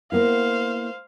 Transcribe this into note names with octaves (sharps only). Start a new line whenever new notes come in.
A#3 B3 E4 C5 F5